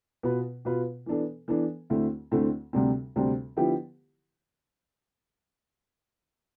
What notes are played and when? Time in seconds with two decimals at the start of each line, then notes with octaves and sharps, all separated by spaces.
0.23 B2 B3 F4 B4
0.65 B2 B3 F4 B4
1.06 E3 B3 D4 A4
1.48 E3 B3 D4 A4
1.90 D2 D3 A3 C4 E4
2.31 D2 D3 A3 C4 E4
2.73 D2 C3 G3 C4
3.16 D2 C3 G3 C4
3.57 D3 F3 B3 E4 G4